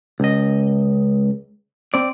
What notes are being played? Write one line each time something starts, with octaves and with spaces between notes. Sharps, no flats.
C#2 D#5
C4 D5